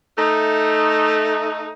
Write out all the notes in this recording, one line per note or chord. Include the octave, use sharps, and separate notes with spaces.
A3 D#4